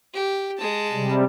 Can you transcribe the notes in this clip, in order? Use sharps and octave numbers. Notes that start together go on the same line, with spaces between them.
G4
G#3 A5
C3 G3